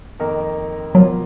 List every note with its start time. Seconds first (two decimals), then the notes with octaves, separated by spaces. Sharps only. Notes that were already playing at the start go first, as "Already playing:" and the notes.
0.19 F2 D#3 A#3 D#4 A#4
0.95 B2 F#3 A#3 F4